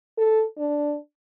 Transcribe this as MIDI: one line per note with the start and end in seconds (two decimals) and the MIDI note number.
0.18 0.44 69
0.58 0.97 62